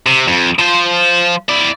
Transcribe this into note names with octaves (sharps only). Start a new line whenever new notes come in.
C3
F2
F3 C5
E4 D5